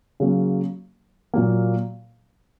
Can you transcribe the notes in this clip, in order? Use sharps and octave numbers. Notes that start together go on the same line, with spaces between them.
C#3 F#3 A#3
A#2 F#3 A#3